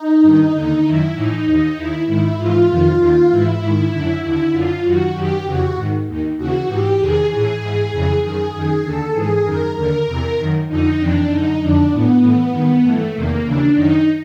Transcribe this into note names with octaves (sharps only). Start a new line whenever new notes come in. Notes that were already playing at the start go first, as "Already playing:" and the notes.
Already playing: D#4
G2 D#3
D#2 D3
F#2 D#3 E4
A2 E3 D#4
D#2 D#3
D#2 D#3 E4
G#2 D#3 E4
G#2 E3 F4
F2 C3 D#3
D#2 D#3
G#2 E3 E4
G#2 D#3
F#2 D3
D#2 D3 E4
F#2 D3 F4
F#2 D#3 F#4
F#2 D#3 G4
F2 C#3 E3 F#4
G#2 D#3
D#2 D#3
D#2 C#3 E3 F#4
G#2 E3 G4
E2 C3 D#3 G#4
A2 E3 G#4
G#2 E3
F2 C#3 E3
F#2 D#3 G#4
F#2 D#3
D#2 D3 A4
G#2 E3 G#4
F#2 D#3 A#4
D#2 D3 A#4
E2 C3 E3
F#2 D#3
F2 D3 D#4
F2 C3 E3 D4
F#2 D3 D#4
F2 D3 D4
A2 E3 B3
A2 E3
G2 D#3
G2 E3 A3
E2 C3 D#3 A#3
D#2 C#3 E3 D4
F#2 D#3 D#4